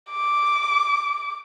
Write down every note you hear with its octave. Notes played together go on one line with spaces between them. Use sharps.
D6